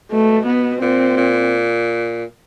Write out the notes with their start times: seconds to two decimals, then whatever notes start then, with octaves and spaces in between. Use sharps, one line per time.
0.12 B2 A3
0.47 B3
0.82 A#2 C4
1.17 A#2